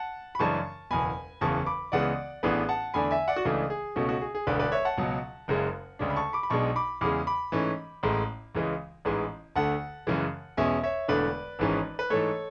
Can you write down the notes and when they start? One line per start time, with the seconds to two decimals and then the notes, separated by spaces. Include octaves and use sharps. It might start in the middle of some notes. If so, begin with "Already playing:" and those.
Already playing: F#5 A5
0.35 B5
0.39 F#2 C#3 E3 G#3 D4 A5 C#6
0.91 F#1 E2 B2 G#5 B5
1.41 F#1 E2 C#3 E3 A5 C#6
1.66 B5 D6
1.92 C#2 C#3 E3 G#3 B3 D5 F#5
2.43 A1 A2 E3 B3 D4 G#4 B4
2.69 F#5 A5
2.94 E2 D3 A3 D4 G#5 B5
3.11 E5 G#5
3.28 D5 F#5
3.36 F#4
3.45 C#2 C#3 E3 A3 D4 G#4
3.70 G#4
3.96 C#2 B2 A3 C#4 F#4
4.09 F#4
4.21 G#4
4.35 G#4
4.47 E1 D2 D3 B4 D5
4.59 B4 D5
4.72 C#5 E5
4.85 F#5 A5
4.97 C#2 B2 F#3
5.48 F#1 F#2 C#3 G#3
5.99 D2 C#3 G#3 D4
6.10 B5
6.16 A5 C#6
6.33 B5 D6
6.43 B5
6.50 B1 B2 G#3 D4 A5 C#6
6.76 B5 D6
7.01 E2 C#3 G#3 B5 D6
7.27 B5 D6
7.52 G#2 E3 A3 C#4
8.03 A1 A2 G#3
8.55 C#2 C#3 E3 G#3
9.05 A1 G#2 E3 G#3
9.55 D2 D3 A3 F#5 A5
10.07 F#2 C#3 E3 G#3
10.57 E2 B2 G#3 C#4 E5 G#5
10.83 C#5 E5
11.08 E1 E2 D3 A3 D4 B4 D5
11.59 G#1 G#2 E3 G#3 C#4
11.99 B4
12.10 G#2 E3 A3 A4 C#5